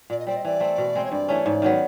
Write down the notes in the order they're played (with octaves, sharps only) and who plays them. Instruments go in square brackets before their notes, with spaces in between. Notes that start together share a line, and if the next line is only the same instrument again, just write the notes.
[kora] A#2 [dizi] D5
[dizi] D#5
[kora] G3 C4 [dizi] D5
[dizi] D#5
[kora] E3 [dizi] D5
[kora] A3 C4
B2
G#3 C4
[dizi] C#5
[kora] G2 [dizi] D5
[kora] E3 A3 C#4
G#2
D#3 F#3 B3